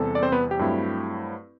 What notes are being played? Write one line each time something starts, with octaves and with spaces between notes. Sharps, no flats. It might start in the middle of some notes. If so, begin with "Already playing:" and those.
Already playing: E2 C3 G3 A4
D5
C4 C5
B3 B4
G4
G2 F#3 A3 C4 E4